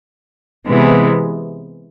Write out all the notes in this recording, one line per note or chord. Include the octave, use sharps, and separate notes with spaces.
C3 E3 G#3 B3